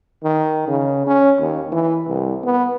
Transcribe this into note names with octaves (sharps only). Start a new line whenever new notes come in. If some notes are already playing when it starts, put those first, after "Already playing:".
D#3
C#3
C#4
D#2
E3
C2
B3